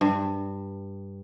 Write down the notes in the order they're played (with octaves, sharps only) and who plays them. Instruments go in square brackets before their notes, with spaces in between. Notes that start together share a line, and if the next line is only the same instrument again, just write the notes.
[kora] G2